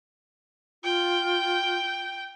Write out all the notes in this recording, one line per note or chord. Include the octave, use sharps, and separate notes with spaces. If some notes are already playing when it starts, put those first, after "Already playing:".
F4 G5